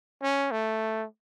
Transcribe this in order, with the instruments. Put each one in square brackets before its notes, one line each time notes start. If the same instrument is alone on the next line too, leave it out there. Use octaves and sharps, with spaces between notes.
[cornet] C#4
A3